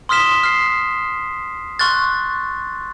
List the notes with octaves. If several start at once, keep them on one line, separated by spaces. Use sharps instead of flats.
C6 D#6 F6 B6 E7 G7
F6 C7
C6 C#6 F6 F#6 A6